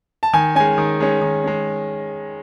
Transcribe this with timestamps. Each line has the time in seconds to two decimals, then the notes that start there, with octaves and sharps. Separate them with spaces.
0.23 A5
0.33 D#3 G#5
0.55 G#3 C#4 G#5
0.78 D#3
1.00 G#3 C#4
1.22 D#3
1.44 G#3 C#4